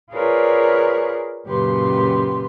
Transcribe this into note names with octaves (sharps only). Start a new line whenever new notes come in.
F4 G#4 A#4 B4 C#5 D5
F#2 A#2 C#3 G4 B4 C6